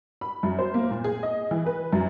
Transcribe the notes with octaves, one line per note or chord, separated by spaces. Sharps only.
B5
F#2
C5
A#3
A#2
G#4
D#5
E3
B4
F#2